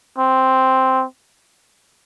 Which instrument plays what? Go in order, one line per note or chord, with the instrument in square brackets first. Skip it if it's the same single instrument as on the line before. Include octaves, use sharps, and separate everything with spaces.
[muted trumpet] C4